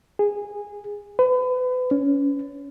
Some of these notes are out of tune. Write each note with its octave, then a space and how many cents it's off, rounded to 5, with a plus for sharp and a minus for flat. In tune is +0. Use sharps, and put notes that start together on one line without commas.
G#4 -15
B4 +35
C#4 +20